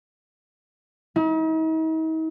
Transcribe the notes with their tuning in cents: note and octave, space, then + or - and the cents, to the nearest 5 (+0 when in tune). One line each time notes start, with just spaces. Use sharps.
D#4 +45